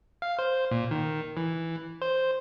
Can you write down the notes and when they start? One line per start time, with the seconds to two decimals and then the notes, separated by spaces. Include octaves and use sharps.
0.22 F5
0.39 C5
0.71 A#2
0.91 D#3
1.37 E3
2.02 C5